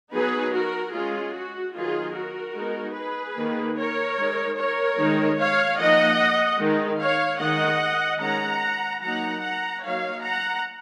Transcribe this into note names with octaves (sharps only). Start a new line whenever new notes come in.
F#3 B3 D#4 G#4 B4
F#4 A#4
G#3 C#4 F4 G#4
F#4
D#3 F#3 B3 D#4 F4 G#4
F#4 A#4
G#3 B3 D#4
G#4 B4
D#3 A#3 D#4
A#4 C#5
G#3 D#4
A#4 C#5
D#3 G#3 D#4
C#5 F5
F3 A#3 D#4 D#5 F#5
D#3 G#3 D#4
C#5 F5
D#3 G#3 D#4 D#5 F#5
D#3 G#3 C#4 F#5 A#5
F#3 A#3 D#4 F#5 A#5
F#5 A#5
F#3 A#3 D#4 C#5 F5
F#5 A#5